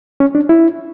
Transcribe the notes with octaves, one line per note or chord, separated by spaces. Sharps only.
C#4
D4
E4